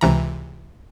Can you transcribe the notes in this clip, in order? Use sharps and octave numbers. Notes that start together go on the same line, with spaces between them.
C#2 C3 E3 A#5